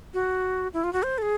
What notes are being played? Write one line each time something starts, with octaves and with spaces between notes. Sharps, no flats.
F#4
E4
F4
F#4
C5
A4
G#4